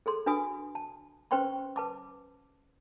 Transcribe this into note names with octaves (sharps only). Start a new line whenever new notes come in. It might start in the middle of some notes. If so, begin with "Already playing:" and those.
G#4 A4 C6
D4 F#4 B4 G#5 D#6
A5
C#4 B4 C5 G5 C6 C#6
B4 A5 D6